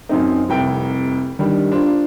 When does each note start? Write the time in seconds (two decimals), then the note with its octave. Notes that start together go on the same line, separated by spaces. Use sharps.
0.09 F#2 C4 D#4
0.49 F1 C2 G5
1.39 D#3 G3 D4
1.72 D4 F4 C5